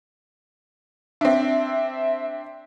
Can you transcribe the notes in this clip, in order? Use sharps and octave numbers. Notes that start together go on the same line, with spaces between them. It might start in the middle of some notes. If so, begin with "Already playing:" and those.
C4 D4 E5